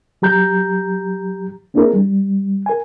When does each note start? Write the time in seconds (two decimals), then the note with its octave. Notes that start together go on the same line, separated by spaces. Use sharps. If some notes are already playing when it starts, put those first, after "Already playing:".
0.22 F#3 G4 A#5 G6
1.74 A#3 C4 D4 E4 G#4 A#4
1.94 G3
2.66 A#4 G#5